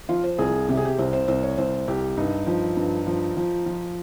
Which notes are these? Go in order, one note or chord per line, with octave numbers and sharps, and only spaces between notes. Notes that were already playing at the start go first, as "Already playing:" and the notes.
F3 F4
C5
C2 G#4
C3 G4
G#4
G4
C2 C5
C5
C2 C5
C#5
C2 C5
C2 G4
G2 D#4
F3
G2
F3
F3
F3